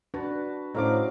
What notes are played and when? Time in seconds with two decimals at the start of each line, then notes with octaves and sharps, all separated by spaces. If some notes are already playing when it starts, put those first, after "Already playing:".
0.14 D4 F#4 B4 A5
0.75 A2 F#3 C#4 A4 C5 D#5 F5 D6